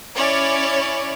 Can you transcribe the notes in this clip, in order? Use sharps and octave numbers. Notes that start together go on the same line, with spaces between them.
C#4 E4 C#5 D5